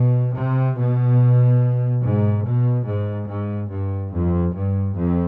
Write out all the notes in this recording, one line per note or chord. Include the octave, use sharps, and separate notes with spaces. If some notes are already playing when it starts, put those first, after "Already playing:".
Already playing: B2
C3
B2
G#2
B2
G#2
G#2
G2
F2
G2
F2